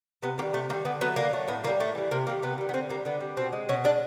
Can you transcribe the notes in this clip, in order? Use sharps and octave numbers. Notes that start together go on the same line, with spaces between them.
C3 B3
D#3 G3 A#3
C3 A3
D#3 G3 A#3
D3 B3
F#3 A3 B3
D3 A#3
F#3 A3
A2 B3
E3 A#3
G3
A2 A3
E3 G3
C3 A#3
D#3 G3 A#3
C3 B3
D#3 G3
B3
D3 C4
G3 A#3
D3 B3
G3
B2 C4
G#3
B2 C#4
G#3 D4